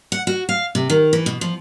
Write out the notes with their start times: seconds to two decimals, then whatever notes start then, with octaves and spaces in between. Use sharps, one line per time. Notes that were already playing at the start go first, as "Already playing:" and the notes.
0.12 F#5
0.27 F#4
0.49 F5
0.75 C3
0.90 D#3
1.13 E3
1.26 B2
1.41 F3